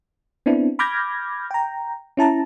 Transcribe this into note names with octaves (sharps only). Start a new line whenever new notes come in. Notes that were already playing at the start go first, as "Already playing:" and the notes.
B3 C4 D4 E4
B5 D6 F6 G6 G#6 A#6
G5 A#5
C#4 E4 A5 A#5